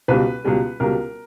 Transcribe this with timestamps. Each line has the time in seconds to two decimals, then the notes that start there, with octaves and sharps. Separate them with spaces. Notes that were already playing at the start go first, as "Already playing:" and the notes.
0.08 C#2 B2 G3 B4
0.45 C#2 B2 G3
0.80 C#2 B2 G3 A#4